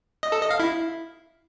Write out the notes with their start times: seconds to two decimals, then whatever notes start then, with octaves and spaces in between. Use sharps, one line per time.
0.23 D#5
0.32 A4
0.41 D#5
0.50 F5
0.60 E4